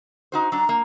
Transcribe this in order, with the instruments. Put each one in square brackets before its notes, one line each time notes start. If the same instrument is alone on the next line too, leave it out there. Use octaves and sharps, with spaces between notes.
[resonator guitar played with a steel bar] D#4 F#4 C5
[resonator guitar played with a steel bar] F#3 D4 [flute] A#5
[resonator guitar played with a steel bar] A#3